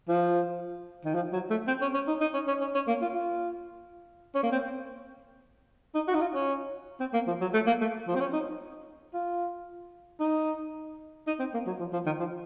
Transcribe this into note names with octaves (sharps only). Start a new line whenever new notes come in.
F3
D#3
F3
F#3
A3
C4
C#4
C#4
D#4
D#4
C#4
C#4
C#4
C#4
A#3
F4
F4
C#4
A#3
C4
D#4
F#4
D#4
F4
C#4
C4
A#3
F3
F#3
A3
A#3
A3
F3
C4
C#4
D#4
F4
D#4
D#4
C4
A#3
F#3
F3
F3
D#3
F3